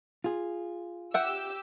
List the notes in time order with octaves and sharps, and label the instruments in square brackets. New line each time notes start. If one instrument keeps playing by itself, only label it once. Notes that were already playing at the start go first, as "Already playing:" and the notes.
[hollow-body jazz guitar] F4 G#4
[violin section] G4 E6 [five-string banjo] E5 F#5 G5